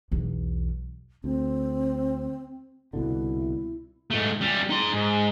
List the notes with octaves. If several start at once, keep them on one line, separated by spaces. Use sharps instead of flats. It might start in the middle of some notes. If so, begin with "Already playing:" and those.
B1 E2
D2 C4
C2 B2 D3 E4
G#2 A3
G3 C#4
D#4 C6
G#2